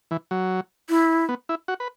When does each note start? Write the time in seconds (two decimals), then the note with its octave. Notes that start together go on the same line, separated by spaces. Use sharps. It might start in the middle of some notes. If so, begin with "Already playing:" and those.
0.11 E3
0.31 F#3
0.90 E4
1.29 B3
1.49 E4
1.68 F#4
1.80 B4